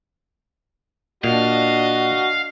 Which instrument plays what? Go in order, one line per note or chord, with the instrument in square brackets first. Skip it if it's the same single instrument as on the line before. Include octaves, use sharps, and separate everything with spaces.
[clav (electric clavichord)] A#2 [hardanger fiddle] D4 D#5 [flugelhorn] F#4 [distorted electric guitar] F5